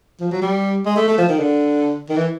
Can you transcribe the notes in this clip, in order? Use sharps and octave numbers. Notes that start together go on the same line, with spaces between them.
F3
F#3
G3
G#3
A3
A3
F3
D#3
D3
D#3
E3